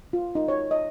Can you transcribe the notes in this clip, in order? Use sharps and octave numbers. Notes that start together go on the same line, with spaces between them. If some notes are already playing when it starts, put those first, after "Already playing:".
F4
D#4
C#5
D#5